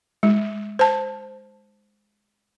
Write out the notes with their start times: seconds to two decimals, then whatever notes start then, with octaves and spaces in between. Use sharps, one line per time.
0.23 G#3
0.79 C5 A5